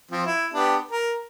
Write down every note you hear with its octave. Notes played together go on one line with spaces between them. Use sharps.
F3 C4
E4
B3 D4 G4
A#4